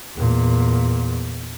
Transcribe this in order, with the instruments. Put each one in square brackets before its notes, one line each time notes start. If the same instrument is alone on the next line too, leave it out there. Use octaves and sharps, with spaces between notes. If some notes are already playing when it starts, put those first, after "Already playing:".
[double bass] E2 A#2